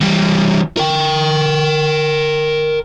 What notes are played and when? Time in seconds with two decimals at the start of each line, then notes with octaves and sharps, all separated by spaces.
0.01 E3 G3
0.77 A#4 G5